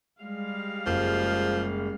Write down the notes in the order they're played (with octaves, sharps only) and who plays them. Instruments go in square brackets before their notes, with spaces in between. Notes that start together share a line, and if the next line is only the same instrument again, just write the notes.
[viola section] G3 G#3 F5
[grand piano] F#1 [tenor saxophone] F3